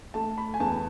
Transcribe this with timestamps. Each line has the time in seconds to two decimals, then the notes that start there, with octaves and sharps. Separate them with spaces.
0.14 A3 A5
0.38 B5
0.54 G#5
0.60 E2 A5